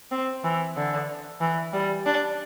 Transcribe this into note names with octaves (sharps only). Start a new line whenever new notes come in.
C4
E3
D3
E3
G3
D4